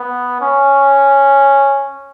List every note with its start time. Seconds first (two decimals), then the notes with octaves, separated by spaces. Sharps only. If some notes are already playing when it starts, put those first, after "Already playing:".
Already playing: B3
0.41 C#4